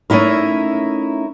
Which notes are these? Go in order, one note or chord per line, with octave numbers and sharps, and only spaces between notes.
A3 C#4 D#4 E4 A#4